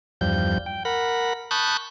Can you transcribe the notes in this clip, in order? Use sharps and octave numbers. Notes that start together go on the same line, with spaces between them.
E2 G2 F3 G3 G6
G5
A#4 F#5 B5
A5 B5 C#6 D#6 F#6 G6